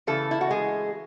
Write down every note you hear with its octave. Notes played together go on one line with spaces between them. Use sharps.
C#3 E3 A3 A4
E4
F#4
G#3 G#4